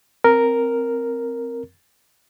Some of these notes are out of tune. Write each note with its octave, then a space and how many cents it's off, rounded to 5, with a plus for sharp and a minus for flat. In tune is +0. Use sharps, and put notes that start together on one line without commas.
C4 +0 A#4 +0